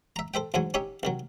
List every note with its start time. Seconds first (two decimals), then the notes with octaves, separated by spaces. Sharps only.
0.16 E5 A#5
0.34 A4 C5 E5 G5
0.54 D2 G#2 F#3 G#5
0.74 C#4 D#4 G4 C#5 E5
1.03 C2 D#3 F#3